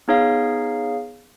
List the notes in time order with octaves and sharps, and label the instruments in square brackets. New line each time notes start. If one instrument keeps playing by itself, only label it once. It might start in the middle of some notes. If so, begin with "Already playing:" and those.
[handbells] B3 D#4 G#4 C#5 F5